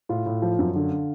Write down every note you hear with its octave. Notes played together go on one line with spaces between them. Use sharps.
A2 F4
A2
F3
F#2
D3